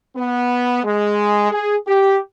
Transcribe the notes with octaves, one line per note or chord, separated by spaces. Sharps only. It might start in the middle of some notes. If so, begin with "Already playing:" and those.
B3
G#3
G#4
G4